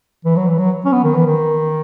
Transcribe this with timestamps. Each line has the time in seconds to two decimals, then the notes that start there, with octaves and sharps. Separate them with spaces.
0.25 E3
0.36 F#3
0.47 E3
0.58 F#3
0.85 C#4
0.92 B3
1.03 D#3
1.15 E3
1.26 D#3